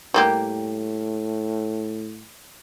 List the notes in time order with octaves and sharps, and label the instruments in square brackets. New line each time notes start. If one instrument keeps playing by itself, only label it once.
[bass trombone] A2 [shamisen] G3 A#3 G4